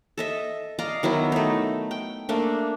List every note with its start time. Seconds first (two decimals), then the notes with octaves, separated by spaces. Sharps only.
0.18 A4 D#5 E5
0.79 D5 D#5 F5 A#5
1.03 D#3 F#3 B3 E4
1.32 A3 D#4
1.91 G5
2.29 A3 A#3 D4